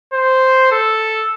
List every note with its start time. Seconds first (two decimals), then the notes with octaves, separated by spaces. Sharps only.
0.13 C5
0.72 A4